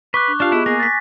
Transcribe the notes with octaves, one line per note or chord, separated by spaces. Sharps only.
B4 C#6 D6 F#6
D4
D4 F4 G4 F5 A5
B3 E4 G#4 D#5
A#3 G#4 G#5 A#6
A6 B6